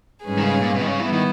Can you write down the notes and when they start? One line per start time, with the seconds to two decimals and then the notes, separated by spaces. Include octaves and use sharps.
0.24 G#2 G3 C#4 G#4 B4
0.38 D#3
0.42 C#3
0.62 A#2
0.74 B2
0.81 D#3
0.87 C#3
1.00 E3 G3 B3 E4
1.13 D#3